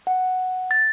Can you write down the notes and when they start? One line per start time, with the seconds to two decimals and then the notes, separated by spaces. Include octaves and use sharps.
0.07 F#5
0.71 A6